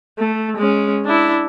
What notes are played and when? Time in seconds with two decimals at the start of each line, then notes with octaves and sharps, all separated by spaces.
0.19 A3
0.57 G#3 C#4
1.05 D4 E4